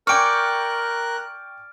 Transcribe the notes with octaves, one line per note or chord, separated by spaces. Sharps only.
A#4 D5 G5 G#5 C#6 F6 F#6 D7